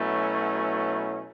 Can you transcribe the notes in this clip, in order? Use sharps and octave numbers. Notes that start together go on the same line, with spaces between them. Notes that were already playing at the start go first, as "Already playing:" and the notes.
Already playing: B2 F#3 A3 C#4 E4